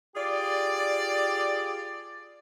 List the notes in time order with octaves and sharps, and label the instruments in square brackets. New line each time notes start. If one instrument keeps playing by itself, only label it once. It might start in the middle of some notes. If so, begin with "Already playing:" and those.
[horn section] F4 G4 G#4 D5